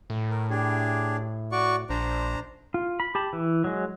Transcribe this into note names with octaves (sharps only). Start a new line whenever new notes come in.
A2
A#4
D4 G4 G#4
F#4 D5 C#6
A#1 D4 C5 A#5
F4
B5
G4 A5 B5
E3
F#3 G#3